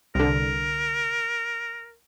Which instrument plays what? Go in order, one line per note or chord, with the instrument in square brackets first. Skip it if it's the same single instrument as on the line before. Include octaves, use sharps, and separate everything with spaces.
[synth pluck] C2 D3 [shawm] A#4